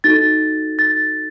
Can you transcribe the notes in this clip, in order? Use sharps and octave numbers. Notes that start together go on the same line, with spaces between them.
D#4 F#4 A4 A6
A6